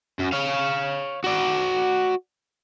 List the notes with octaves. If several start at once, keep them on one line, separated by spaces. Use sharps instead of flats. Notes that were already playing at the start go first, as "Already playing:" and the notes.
F#2
C#5 F5
F#4 D5